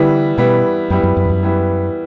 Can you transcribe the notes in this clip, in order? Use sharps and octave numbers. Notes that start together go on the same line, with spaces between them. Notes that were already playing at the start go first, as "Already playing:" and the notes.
Already playing: D3 E3 G3 B3 E4
B2 E3 G3 B3 E4
F#2 E3 G3 B3 E4
F#2
F#2
E2
F#2
E3 G3 B3 E4